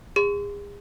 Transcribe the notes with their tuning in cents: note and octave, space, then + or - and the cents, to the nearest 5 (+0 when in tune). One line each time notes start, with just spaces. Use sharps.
G#4 -40 C6 -30